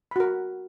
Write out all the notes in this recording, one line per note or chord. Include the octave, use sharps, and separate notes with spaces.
F#4 A#4 B5